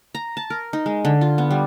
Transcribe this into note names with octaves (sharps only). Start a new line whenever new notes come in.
A#5
A5
A#4
D#4
G#3
D3
F4
B3
G3